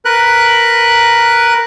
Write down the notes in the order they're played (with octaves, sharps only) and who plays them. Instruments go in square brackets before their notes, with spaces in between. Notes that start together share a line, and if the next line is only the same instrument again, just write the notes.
[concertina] A#4 B4 F#6